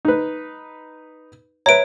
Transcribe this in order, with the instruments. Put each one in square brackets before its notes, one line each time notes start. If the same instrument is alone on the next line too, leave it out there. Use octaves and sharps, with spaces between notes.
[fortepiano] D#4 B4
[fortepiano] B4 E5 A#5 [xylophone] C#5 D7